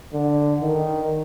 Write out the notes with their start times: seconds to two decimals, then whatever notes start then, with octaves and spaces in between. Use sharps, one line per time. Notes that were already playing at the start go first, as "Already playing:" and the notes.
0.13 D3
0.61 D#3